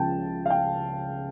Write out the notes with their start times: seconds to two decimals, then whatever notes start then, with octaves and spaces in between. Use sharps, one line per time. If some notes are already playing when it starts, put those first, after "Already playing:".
Already playing: C#2 C#3 F3 G5 A5
0.46 F5
0.50 G5